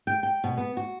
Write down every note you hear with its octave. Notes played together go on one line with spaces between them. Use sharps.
G5
G5
B2
B3
F#4